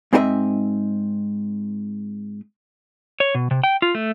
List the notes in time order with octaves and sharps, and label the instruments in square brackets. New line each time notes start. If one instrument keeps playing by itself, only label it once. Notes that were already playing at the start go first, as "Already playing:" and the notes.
[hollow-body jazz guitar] G#2 C4 F#4 A#4 D#5 E5
[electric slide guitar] C#5
B2
C3
G5
F4
A3